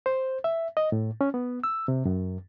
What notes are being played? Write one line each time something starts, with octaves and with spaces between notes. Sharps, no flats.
C5
E5
D#5
A2
C#4
B3
E6
C3
F#2